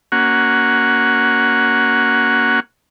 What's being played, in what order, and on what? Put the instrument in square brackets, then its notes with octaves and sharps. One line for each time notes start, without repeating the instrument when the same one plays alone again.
[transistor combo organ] A#3 C#4 F#4 F#5